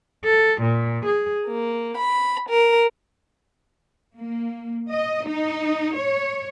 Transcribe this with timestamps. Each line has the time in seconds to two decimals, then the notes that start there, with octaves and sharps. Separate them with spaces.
0.25 A4
0.63 A#2
1.06 G#4
1.46 A#3
1.97 B5
2.48 A#4
4.17 A#3
4.90 D#5
5.27 D#4
5.96 C#5